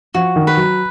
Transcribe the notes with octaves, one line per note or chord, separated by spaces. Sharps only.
F3 F#4
D#3
B4
F#3